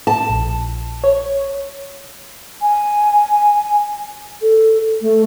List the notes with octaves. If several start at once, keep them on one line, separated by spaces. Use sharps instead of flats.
A5
A#1
C#5
G#5
A4
A3